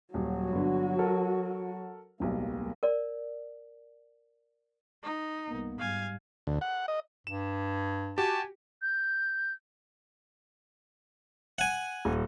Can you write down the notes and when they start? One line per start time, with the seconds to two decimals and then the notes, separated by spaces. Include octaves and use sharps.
0.14 D#1 F#3 F#4
0.52 G1 D3
0.99 A4 A#4
2.20 D1 B1 G3 A#3
2.83 A#4 D5
5.03 D#4
5.48 C2 A#3 B3
5.79 G#2 G3 F5 G#5
6.47 D2
6.61 F#5
6.88 D#5
7.27 G2 E7
8.18 F#4 G4 G#5 A5
8.82 G6
11.58 F#5 G#5
12.05 D#1